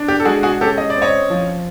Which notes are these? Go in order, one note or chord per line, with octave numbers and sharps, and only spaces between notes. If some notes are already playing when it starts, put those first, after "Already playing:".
Already playing: D4
G4
A4
G#3 F#4 G#4
F#4 G#4
C#4 G4 A4
D#5
D5
C4
C#5 D#5
F3